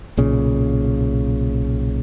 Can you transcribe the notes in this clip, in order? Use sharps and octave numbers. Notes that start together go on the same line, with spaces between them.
B1 A#2 C#3